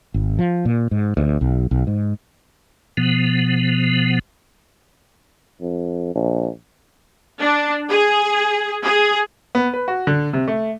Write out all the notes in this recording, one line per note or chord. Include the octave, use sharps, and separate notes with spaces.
G#1
F3
A#2
G#2
D2
B1
B1
G#2
B2 F3 B3
F2
A#1
D4
G#4
G#4
B3
B4
F#4
D3
C3
A3